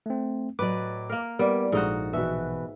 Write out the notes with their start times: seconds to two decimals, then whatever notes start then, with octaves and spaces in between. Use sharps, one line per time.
0.06 A3 C4
0.59 A2 F#3 B4 D5 D#5 D6
1.09 A#3 A#4
1.39 G3 B3 E4 A#4 D5
1.72 A#1 G#2 D#4 F#4 A4
2.13 B2 E3 F#4 E5